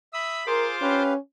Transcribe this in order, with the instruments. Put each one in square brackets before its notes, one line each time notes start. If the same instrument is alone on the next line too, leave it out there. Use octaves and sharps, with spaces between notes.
[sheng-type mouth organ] E5 D#6 E6 [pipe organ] B5
[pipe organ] F4 C5 D6 [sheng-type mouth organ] G#4 C6 [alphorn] A#4
[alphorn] C#4 [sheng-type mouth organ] G4 B4 F5